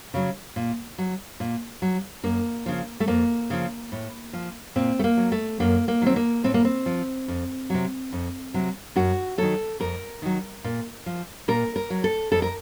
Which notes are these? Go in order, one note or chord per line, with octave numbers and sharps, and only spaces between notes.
C#3 F#3
A#2
F#3
A#2
F#3
F#2 A#3
C#3 F3
A3
F2 A#3
C#3 F3
A2
F3
A#2 C4
A3
A#3
F#3
A3
F#2 A#3
A#3
D#3 F#3 C4
A#3
A2 C4
A#3
C4
F3
F2
C3 F#3
F2
C3 F#3
F#2 F#4
D#3 F#3 A4
F2 A#4
D#3 F#3
A#2
F3
A#2 A#4
A#4
F#3
A4
F2 A4
A#4